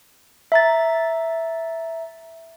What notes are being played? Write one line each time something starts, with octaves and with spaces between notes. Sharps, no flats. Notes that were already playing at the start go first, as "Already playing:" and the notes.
E5 A#5 A6